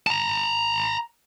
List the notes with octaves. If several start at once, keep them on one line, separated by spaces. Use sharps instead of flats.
A5 A#5